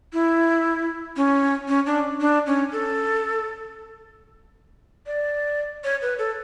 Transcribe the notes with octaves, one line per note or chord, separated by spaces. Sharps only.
E4
C#4
C#4
D4
D4
C#4
A4
D5
C#5
B4
A4